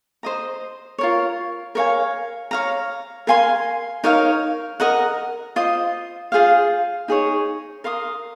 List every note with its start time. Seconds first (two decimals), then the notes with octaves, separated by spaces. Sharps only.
0.23 C5 D#5 A#5
0.98 F4 A#4 C#5
1.75 A#4 C#5 F5 G#5
2.51 C#5 F5 A#5
3.27 A#4 F5 G#5 C6
4.04 D#4 A#4 C#5 F5
4.80 A#4 D#5 F#5 A#5
5.56 F4 C5 D#5
6.32 F4 G#4 C5 F5
7.08 D#4 G#4 C#5
7.84 A#4 F5 C6 D#6